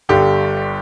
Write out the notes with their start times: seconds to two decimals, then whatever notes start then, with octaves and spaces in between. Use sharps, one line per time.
0.09 G1 G2 D3 G4